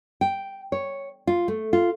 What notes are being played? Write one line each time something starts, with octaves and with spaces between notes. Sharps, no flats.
G5
C#5
F4
A3
F4